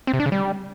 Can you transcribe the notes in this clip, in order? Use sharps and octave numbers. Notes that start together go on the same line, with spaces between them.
C4
C3
D4
C#3
G3